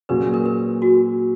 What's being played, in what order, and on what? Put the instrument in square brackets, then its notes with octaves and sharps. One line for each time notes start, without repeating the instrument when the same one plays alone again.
[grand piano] A#2 F#3 C#4 G#4 [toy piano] B4
[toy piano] A#4
B4
F#4